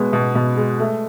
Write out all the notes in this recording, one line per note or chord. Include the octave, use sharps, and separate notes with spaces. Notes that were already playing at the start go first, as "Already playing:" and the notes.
Already playing: B2 G#3 B3
B2
B2
G#3
A3